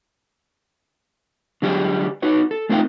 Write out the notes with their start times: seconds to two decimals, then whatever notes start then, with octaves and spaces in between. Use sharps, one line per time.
1.62 D3 F#3 G3 G4 G#4
2.22 D#4 F#4 B4 C#5
2.51 A4
2.69 A3 C4 D#4 F4 A#4 G5